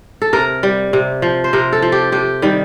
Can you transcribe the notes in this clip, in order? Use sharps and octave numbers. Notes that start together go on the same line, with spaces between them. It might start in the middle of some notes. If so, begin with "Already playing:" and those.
A4
C3 A#4
G3
C3
F3
C5
C3 A#4
A4
F3
G4
C3 G4
D#3 G3